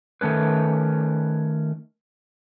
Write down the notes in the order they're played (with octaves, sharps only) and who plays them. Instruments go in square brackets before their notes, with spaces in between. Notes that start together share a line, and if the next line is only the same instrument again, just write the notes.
[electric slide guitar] D#3 A3 C#4 B4